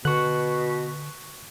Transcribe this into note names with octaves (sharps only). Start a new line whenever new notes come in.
B2 D3 C#6 F#6